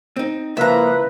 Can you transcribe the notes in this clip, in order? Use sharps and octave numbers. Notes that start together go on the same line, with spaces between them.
C4 D#4
C#2 F3 A#3 E4 B4 E5 A#5